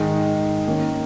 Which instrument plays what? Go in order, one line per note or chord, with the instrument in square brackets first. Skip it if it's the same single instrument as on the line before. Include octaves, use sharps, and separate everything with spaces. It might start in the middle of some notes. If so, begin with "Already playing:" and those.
Already playing: [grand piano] G#2 D#3 G#3 D#4
D#3 A#3 C#4